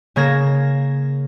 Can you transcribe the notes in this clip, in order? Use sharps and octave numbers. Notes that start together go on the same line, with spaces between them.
C#3 A#3 G#6 A#6 E7